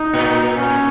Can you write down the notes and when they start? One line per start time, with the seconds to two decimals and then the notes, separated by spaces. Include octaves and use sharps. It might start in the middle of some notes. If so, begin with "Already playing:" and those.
Already playing: D#4
0.13 A#2
0.56 C#4